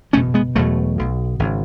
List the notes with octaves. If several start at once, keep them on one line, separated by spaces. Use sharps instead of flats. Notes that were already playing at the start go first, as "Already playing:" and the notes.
F#1 E2 B2 A3 C#4
G#3 B3
E1 E2 B2 F#3 A3
B1 B2
G#1 C#3